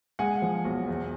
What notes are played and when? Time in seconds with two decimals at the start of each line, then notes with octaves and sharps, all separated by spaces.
0.19 G#3 F#5 G#5
0.42 F3
0.65 B1
0.88 E2